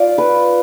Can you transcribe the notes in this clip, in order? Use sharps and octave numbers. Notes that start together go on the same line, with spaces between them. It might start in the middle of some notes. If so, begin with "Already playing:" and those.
Already playing: F4 D5
B4